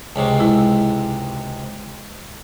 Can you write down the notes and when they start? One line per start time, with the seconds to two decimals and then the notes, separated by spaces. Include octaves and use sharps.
0.16 C#2 G#2 C3
0.40 G#3 E4